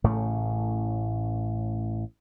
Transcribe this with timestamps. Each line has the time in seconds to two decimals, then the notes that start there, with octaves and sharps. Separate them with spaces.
0.04 A1 A2 C#3 A3